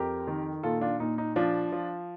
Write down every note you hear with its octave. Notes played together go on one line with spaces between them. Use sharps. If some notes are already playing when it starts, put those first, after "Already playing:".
Already playing: F2 G4 A#4
D#3
A#2 F4 A4
D4 F4
A#2 D#4
D#4
F3 D4 F4
F3